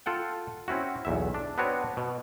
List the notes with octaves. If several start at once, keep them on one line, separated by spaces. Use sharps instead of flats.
F4 A4 F#5 G5
C4 C#4 E4 F#4
B1 E2 E5
D4
B3 C4 D4 F#4 B4 C#5
B2